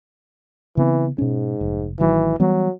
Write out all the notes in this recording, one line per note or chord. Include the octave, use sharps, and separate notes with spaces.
C#3 E3 B3 C4
G#2 B2 C#4
F1
A1 D#3 E3 F#3
E3 F#3 G3 B3